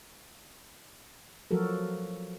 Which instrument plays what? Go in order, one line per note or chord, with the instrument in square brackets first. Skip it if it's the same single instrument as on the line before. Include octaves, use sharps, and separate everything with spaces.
[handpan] F3 F#3 F#4 A4 A#4